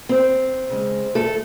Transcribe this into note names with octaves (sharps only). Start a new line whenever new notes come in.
C4
C#3 G#3
A3 A4